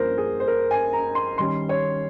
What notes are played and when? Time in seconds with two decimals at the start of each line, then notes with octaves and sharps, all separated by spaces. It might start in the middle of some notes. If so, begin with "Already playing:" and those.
Already playing: G2 F3 A#3 C#4 A#4 C5
0.18 G#4
0.40 C5
0.48 A#4
0.71 G#5
0.93 A#5
1.15 C6
1.38 D#3 G3 C#4 C6
1.69 C#5